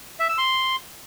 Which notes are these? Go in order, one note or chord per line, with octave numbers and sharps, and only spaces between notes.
E5
E6
C6